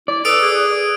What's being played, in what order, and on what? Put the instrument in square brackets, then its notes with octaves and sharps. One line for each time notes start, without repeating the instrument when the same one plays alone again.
[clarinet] E4 [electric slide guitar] D5
[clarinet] A4 [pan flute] B4 [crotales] D#6 E6 D7
[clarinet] G#4